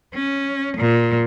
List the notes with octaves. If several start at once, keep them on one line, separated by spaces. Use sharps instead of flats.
C#4
A#2